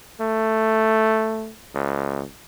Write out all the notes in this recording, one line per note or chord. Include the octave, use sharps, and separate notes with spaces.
A3
C#2